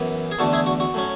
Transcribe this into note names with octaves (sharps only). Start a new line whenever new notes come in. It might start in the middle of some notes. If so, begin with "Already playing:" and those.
Already playing: F#2 E3 B3
G#4
E2 D3 A3 F#4 A4
E4 G#4
F#4
F#4
A2 F#3 C#4